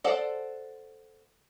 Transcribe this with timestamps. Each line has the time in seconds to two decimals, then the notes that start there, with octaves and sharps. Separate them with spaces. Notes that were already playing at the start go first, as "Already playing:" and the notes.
0.04 A4 C5 D5 F#5